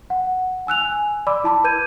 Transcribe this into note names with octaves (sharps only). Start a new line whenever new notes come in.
F#5
G#5 E6 F#6 F7
G#5
D5 B5 D6 E6
E4 A5 B5 D6
B4 G6 G#6 D#7